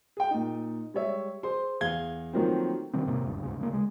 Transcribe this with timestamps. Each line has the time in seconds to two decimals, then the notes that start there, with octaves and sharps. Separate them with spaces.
0.17 G#4 G5
0.31 A#2 D#4
0.94 G3 G#3 C#5 E5
1.43 G#4 C5 C6
1.81 E2 G#4 F5 G#6 G7
2.33 D#3 F3 F#3 A3 A#3 C4
2.93 B2 D#3 G3 C4
3.06 E1 G#2 C3 A#3
3.25 D#1 D2 G2
3.43 D2 G#2 C#3
3.59 C#3 F#3 A#3
3.73 G#3